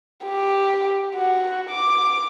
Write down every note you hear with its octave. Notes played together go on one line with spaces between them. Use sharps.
G4
F#4
D6